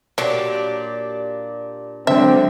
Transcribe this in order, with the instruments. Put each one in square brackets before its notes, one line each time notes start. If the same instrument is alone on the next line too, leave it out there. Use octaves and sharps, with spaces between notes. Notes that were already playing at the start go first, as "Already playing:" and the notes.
[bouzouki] A#2 D4 G4 [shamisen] F#3
[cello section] D3 F#3 G#3 [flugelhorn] C4 [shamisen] E5